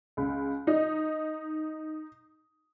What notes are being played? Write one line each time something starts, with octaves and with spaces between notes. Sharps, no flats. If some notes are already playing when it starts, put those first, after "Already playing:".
C#2
D#4